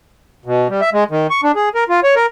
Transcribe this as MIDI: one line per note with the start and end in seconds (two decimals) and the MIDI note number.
0.45 0.68 47
0.69 0.81 55
0.81 0.90 76
0.93 1.04 56
1.11 1.27 51
1.30 1.41 85
1.43 1.52 62
1.55 1.69 68
1.75 1.84 70
1.89 2.00 65
2.04 2.15 73
2.16 2.26 70